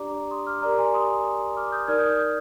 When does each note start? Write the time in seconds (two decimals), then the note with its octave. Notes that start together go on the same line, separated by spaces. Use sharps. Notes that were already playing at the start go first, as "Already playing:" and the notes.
Already playing: D4 G4 D5 A#5 D6
0.31 C6 D#6
0.47 D6 F6
0.62 G4 A#4 D5 A#5 D6
0.78 G#5 C6
0.94 C6 D#6
1.57 D6 F6
1.72 D#6 G6
1.88 D#4 A#4 D5 F6 G#6
1.98 D#6 G6
2.09 D#6 G6
2.19 D#6 G6